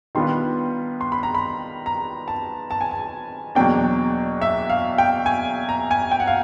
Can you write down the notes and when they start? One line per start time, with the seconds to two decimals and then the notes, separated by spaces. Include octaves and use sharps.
0.15 D#3 G3 B3 D4 F4 C6
1.01 C6
1.12 B5
1.23 A#5
1.35 B5
1.86 A#5
2.28 A5
2.71 A5
2.81 G#5
2.91 A5
3.55 E2 B2 F#3 A#3 D4 G5
4.41 E5
4.70 F5
4.98 G5
5.26 G#5
5.69 A#5
5.91 G#5
6.11 G5
6.20 F#5
6.27 F5